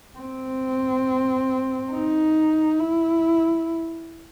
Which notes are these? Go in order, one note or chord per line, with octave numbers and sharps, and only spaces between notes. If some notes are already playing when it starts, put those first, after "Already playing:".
C4
D#4
E4